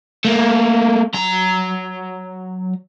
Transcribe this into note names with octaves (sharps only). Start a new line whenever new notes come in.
A3 A#3
F#3 A#5